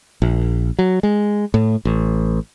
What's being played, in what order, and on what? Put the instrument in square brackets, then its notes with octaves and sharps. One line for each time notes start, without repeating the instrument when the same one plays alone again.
[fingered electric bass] A#1
F#3
G#3
A2
A1